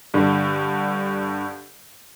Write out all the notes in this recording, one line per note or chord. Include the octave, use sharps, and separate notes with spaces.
G2 D3